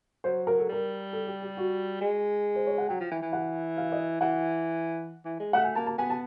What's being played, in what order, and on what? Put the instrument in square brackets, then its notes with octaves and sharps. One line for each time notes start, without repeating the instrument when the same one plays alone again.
[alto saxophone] F#3 [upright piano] C5
[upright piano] A#4
A4
[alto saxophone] G3 [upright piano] A#4
[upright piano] A4
G4
G4
F#4
[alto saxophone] G#3
[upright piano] C5
C#5
F#5
[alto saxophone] F#3 [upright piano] G5
[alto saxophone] F3
E3
E3
[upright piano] F#5
F5
D#5
[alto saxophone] E3 [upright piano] F#5
[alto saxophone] E3
G#3
[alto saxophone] A3 [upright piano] F#5
[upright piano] G#5
[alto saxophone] A#3 [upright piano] A5
[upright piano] A5
[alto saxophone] B3 [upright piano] G#5
[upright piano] A5